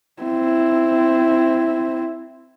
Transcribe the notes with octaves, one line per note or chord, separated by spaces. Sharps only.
C4 E4